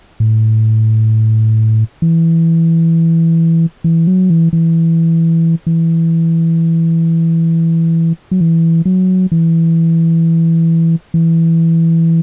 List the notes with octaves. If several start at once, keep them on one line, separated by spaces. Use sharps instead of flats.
A2
E3
E3
F#3
E3
E3
E3
F#3
E3
F#3
E3
E3